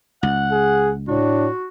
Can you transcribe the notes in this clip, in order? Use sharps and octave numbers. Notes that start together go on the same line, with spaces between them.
C#2 F#5
G#4
A2 D4 F#4